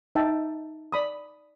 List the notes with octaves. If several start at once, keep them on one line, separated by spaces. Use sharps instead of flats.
D#4 E5 G5 A5
D5 B5 D#6